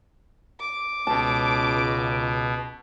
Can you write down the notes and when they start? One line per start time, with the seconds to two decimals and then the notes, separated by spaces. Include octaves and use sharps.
0.60 D6
1.07 C#2 B2 A5